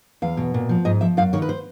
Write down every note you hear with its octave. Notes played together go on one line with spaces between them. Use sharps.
E2 F5
B2
A#2
F3
G#2 D#5
F3 E5
F#2 F5
D#3 C#5
B4
C5